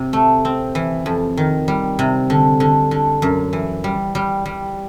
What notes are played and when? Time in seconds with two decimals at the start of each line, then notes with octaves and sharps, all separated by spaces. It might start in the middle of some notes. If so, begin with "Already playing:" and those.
Already playing: C3
0.13 A3
0.45 C4
0.75 E3
1.06 F2
1.37 D#3
1.68 G3
1.99 C3
2.30 D3
2.60 D3
2.91 D3
3.22 F#2
3.53 E3
3.84 G3
4.15 G3
4.46 G3